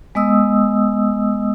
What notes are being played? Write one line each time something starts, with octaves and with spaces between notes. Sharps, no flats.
G#3 B3 D#5 D#6 E6